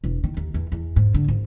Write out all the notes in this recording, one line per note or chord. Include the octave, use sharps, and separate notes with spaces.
E1
D#3
D#2
E2
E2
G#2
D3
G#1